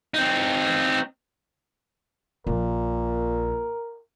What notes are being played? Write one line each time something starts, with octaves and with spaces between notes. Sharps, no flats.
C4 D#4
A#1 A#2 F3 A#4